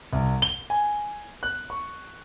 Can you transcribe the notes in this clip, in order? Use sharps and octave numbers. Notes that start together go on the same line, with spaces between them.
C2
G7
G#5
F#6
C#6